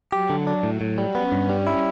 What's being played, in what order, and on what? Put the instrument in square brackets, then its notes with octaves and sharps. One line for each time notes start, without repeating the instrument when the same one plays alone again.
[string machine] F#3 [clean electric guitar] G4
[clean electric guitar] D3
D4
A2
A2
G3
[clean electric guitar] B3 [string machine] C#4
[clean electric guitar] G2
G3
E4